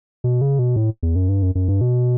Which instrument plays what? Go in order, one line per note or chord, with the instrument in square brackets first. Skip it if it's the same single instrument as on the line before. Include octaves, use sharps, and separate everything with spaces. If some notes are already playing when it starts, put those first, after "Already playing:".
[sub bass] B2
C#3
B2
A2
E2
F#2
G2
F#2
F#2
G2
B2